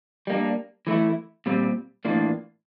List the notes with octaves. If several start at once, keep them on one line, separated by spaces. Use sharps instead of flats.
G3 A#3 D4
E3 A3 E4
A#2 G3 C4
A2 E3 A#3 D4 F4